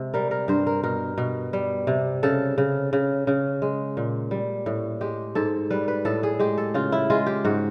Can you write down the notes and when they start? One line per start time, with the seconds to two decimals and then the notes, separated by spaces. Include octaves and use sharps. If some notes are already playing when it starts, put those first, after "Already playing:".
Already playing: C3 G#3
0.14 G3 A#4
0.31 A#4
0.48 G2 C5
0.67 A#4
0.83 B2 A#4
1.18 B2
1.53 G3
1.87 C3
2.23 C#3 A4
2.58 C#3
2.93 C#3
3.27 C#3
3.62 G#3
3.97 A#2
4.31 G3
4.66 A2
5.01 G#3 G4
5.35 G#2 A4
5.71 G3 B4
5.88 B4
6.05 A2 A4
6.23 G#4
6.39 G#3 G4
6.58 A4
6.74 C#3 F4
6.92 E4
7.10 G#3 F4
7.26 G4
7.45 G#2 F#4